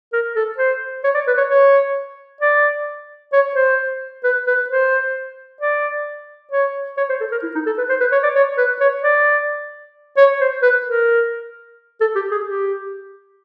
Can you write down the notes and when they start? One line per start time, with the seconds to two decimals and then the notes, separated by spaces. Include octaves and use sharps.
0.13 A#4
0.36 A4
0.58 C5
1.04 C#5
1.15 D5
1.27 B4
1.38 C#5
1.50 C#5
2.41 D5
3.33 C#5
3.56 C5
4.24 B4
4.47 B4
4.70 C5
5.61 D5
6.52 C#5
6.97 C#5
7.09 C5
7.21 A4
7.32 A#4
7.43 E4
7.55 D#4
7.66 A4
7.78 B4
7.89 C5
8.00 B4
8.12 C#5
8.23 D5
8.35 C#5
8.58 B4
8.81 C#5
9.03 D5
10.17 C#5
10.41 C5
10.63 B4
10.86 A#4
12.01 A4
12.16 G4
12.31 G#4
12.46 G4